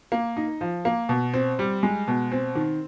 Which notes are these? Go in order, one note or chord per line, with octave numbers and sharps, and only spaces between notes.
A#3
D#4
F3
A#3
B2
C4
G3
G#3
B2
C4
D#3